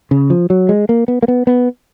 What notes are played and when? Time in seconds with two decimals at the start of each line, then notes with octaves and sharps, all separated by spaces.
0.11 C#3
0.30 F3
0.50 F#3
0.69 G#3
0.89 A#3
1.08 B3
1.23 A#3
1.28 B3
1.47 B3